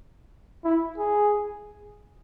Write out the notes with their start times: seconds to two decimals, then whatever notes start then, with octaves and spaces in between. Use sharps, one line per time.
0.64 E4
0.98 G#4